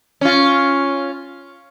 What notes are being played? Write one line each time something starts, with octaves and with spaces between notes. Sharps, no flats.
C#4 F4